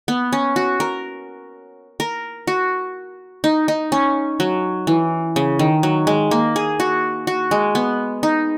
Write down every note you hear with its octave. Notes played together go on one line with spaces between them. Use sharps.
B3
C#4
F#4
A#4
A#4
F#4
D#4
D#4
C#4
F#3
E3
C#3
D#3
F#3
G#3
A#3
G#4
F#4
F#4
G#3
B3
D#4